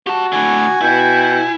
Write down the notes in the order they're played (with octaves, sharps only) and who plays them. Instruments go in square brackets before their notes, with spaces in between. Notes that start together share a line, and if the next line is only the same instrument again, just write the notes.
[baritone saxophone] F#4 [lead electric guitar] G4 A5
[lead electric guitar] A2 D3 [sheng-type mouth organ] G#5
[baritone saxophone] B2 [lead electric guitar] E4 [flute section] G5 G6